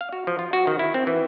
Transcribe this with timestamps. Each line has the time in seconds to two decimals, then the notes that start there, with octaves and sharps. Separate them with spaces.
0.01 F5
0.13 F#4
0.27 F3
0.39 F4
0.53 F#4
0.67 D#3
0.79 E4
0.94 C4
1.07 E3